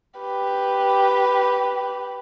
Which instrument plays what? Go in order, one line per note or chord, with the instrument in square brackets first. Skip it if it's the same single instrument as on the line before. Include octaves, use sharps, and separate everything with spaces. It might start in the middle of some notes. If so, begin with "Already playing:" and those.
[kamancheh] G4 B4